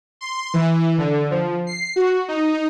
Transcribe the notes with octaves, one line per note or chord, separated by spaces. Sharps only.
C6
E3
D3
F3
C7
F#4
D#4